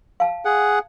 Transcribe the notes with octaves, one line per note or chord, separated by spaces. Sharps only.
F5 A5
G#4 F#5